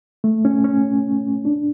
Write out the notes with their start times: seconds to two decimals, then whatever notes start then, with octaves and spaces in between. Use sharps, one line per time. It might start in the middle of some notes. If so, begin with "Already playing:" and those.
0.24 A3
0.45 C#4
0.65 C#4
1.45 D4